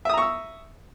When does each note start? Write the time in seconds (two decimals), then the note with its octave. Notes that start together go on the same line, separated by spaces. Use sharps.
0.05 E5
0.09 D#6
0.13 A#5
0.18 C#6
0.22 E6